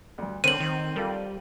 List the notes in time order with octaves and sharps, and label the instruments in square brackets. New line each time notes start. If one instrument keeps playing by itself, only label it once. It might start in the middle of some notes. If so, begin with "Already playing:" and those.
[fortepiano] D2 G2
[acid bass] D3 [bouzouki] C4 [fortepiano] A#4 C#5 [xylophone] D#7 F#7
[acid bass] D#3
[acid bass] G3 [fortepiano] F4 A4 A#4